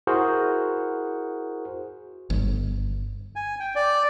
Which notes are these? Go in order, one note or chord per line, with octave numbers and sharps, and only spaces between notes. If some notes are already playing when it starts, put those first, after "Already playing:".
E4 F#4 G#4 A#4 C5
G1
G#5
G5
D5